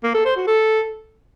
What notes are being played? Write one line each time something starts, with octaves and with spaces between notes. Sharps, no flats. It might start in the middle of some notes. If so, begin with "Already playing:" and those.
A#3
A4
C5
F#4
A4